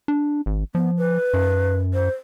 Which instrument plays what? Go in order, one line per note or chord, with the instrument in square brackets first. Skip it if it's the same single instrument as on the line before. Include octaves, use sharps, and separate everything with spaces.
[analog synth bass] D4
G#1
[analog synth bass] F3 [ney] B3
[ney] B4
[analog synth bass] F#2
[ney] C5